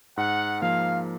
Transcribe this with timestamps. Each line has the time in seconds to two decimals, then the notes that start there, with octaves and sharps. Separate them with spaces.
0.17 G#2 F#5
0.61 F3 A#3 F5